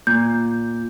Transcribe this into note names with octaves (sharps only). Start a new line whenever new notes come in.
A#2 G6